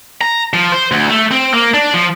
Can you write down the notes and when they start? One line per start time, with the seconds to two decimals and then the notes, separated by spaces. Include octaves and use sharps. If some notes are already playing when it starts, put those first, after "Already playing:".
0.21 A#5
0.53 F3
0.72 C5
0.92 D2
1.10 A3
1.31 C4
1.54 A#3
1.74 D4
1.94 F3